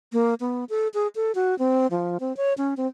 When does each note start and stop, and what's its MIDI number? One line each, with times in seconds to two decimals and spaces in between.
0.13 0.34 58
0.40 0.65 59
0.70 0.88 69
0.94 1.07 68
1.16 1.32 69
1.35 1.58 66
1.59 1.87 60
1.91 2.18 53
2.20 2.35 60
2.37 2.53 73
2.58 2.74 61
2.77 2.87 60